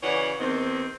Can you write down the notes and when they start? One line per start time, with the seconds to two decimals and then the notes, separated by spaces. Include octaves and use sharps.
0.02 C#3 E3 F#4 C#5 D5 F#5
0.40 E2 D#3 C4